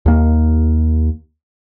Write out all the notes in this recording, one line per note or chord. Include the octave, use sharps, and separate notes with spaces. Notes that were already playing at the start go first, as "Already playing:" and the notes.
D#2 A#3